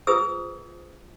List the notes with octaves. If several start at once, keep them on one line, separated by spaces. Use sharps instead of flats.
F4 G#4 B4 C5 D#6 E6